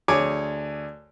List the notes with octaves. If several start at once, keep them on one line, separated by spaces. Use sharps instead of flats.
D2 G#4 C#5 G#5 D6